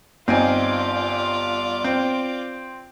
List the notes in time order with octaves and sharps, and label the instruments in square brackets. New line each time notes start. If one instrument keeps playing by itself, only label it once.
[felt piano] G1 [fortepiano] C4 D#4 G#5 [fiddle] F4 D5
[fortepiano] C4